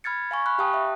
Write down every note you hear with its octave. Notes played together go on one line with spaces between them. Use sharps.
B5 F6 G#6 A6 C#7
F5 G#5 C#6
B5 C#6 F6 F#6
G4 F5 G5 A5 D#6 F#6
E5